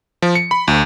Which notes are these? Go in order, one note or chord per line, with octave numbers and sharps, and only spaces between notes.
F3
C#7
B5
D2